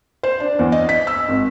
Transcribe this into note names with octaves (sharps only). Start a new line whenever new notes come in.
C5
D4
E2
D#5
B6
E6
G#1